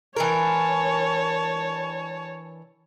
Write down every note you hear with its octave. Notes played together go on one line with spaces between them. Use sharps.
E3 D4 A#4 C#5 A5